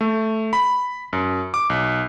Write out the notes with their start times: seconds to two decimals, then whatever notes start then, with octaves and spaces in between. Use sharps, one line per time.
0.01 A3
0.53 B5
1.13 F#2
1.54 D6
1.70 B1